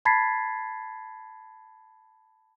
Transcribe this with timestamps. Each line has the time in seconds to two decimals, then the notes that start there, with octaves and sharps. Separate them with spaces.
0.05 A5 B5 G#6 A6 B6 C7